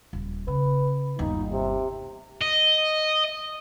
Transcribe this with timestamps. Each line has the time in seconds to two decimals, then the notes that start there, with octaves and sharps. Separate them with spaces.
0.13 D#1
0.48 C#3 B4
1.19 G1 D#2 D#4
1.51 C3
2.41 D#5